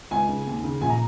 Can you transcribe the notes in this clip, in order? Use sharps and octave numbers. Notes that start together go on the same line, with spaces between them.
C#2 G#5
C#3
D#2
C#3
A#1 G#5
A#5